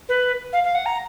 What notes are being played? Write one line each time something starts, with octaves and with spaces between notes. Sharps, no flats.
B4
F5
F5
F#5
A#5